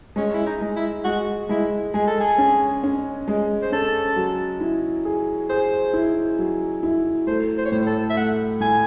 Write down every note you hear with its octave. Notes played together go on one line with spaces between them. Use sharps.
G#3 C#4
E4
D#4
G#3
E4
G#3 F#4
G#3 E4
G#3 G#4
A4
G#4
C#4
C#4
G#3
C5
C#4 A4
F#3
E4
G#4
G#4 C5
E4
F#3
E4
A3 C5
C5
C#5
A2 C5
A4
E5
A3 F#5
A2 G#5